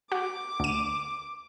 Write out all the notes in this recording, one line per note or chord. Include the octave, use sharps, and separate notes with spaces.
F#4 D6
D2 D#7